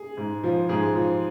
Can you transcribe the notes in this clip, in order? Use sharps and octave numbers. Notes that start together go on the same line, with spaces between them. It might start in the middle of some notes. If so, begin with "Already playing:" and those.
Already playing: G#4
G#2
F3
G#2 G#4
F3